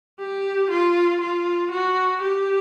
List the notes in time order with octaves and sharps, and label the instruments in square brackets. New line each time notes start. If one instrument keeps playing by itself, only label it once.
[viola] G4
F4
F4
F#4
G4